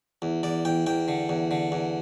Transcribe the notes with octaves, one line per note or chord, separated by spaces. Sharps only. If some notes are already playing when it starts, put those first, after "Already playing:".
E2
E2 D5
E2 G5
E2 G5
D3
E2
D3
E2